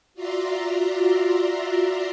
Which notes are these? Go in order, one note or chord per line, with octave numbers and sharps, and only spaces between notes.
F4 F#4 D5 E5 A#5 C6